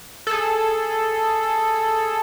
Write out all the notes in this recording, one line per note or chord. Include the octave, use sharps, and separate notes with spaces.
G#4 A4